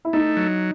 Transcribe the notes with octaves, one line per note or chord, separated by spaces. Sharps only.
E4
A3 D#4
F#3